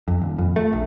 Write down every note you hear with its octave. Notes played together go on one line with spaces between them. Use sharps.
F2
D#1
F2
A3
A#1